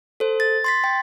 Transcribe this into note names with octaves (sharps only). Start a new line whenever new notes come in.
A4 C5
A6
C6 A6 B6
G5